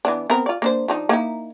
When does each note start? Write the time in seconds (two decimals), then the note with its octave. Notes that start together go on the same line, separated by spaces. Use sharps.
0.05 E3 B3 D4
0.30 B3 C4 A#4
0.46 F4 D5
0.62 A#3 D4 C5
0.88 F3 D4 D#4
1.09 A#3 D#4 E4